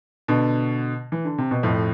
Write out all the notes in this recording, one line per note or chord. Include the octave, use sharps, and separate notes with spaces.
B2 D3
E3
D3
C3
B2
F2 A2